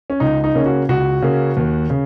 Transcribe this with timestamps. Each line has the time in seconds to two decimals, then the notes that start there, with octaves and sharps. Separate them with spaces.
0.10 C#4
0.20 C#2 D#4
0.44 D#4
0.55 C#3 A#3 C#4
0.66 F#4
0.89 C#2 F#4
1.22 C#3 A#3 C#4
1.57 D#2
1.90 C#3